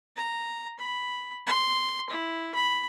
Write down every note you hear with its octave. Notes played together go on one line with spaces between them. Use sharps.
A#5
B5
C6
E4
B5